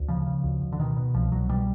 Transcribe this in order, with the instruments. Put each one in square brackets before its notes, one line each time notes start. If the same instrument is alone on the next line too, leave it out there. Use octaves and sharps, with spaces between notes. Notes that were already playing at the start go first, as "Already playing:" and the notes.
Already playing: [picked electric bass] D2
C#3 F3
C#3
D2
D2
D3
B2 D#3
B2
C2 F3
C2 F#3
B2 G3